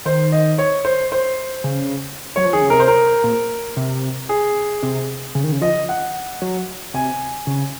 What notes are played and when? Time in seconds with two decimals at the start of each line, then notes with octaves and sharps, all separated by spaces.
0.05 D#3 C5
0.32 D#5
0.58 C#5
0.85 C5
1.12 C5
1.64 C#3
2.36 F#3 C#5
2.45 F3
2.53 D#3 G#4
2.61 C#3
2.70 C3 A#4
2.80 C5
2.88 A#4
3.24 A#2
3.77 C3
4.29 G#4
4.83 C3
5.35 C#3
5.44 D#3
5.52 C#3
5.62 F3 D#5
5.89 F#5
6.42 F#3
6.94 C3 G#5
7.47 C#3